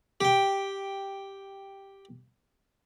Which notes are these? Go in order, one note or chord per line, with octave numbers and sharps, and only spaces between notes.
G4 G5